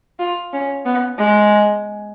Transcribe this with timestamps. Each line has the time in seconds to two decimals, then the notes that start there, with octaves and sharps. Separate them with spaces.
0.19 F4
0.53 C#4
0.85 B3
1.18 G#3